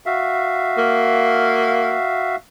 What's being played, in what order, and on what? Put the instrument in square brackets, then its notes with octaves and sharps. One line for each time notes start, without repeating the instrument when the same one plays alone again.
[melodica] F#4 E5 F5
[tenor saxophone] A#3